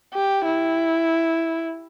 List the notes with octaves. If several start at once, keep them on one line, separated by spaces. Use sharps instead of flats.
G4
E4